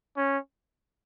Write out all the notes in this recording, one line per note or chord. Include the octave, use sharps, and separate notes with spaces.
C#4